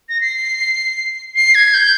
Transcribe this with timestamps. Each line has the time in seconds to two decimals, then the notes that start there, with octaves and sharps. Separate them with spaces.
0.09 A#6
0.21 C7
1.36 C7
1.55 G#6
1.74 G6